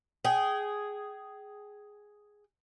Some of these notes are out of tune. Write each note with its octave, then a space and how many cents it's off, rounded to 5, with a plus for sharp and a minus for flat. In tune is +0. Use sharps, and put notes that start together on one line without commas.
G#4 +0 G5 -25